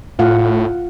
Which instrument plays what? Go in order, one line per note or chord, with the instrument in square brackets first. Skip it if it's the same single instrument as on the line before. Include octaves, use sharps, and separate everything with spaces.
[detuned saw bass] A2 [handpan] F4 F5 F#5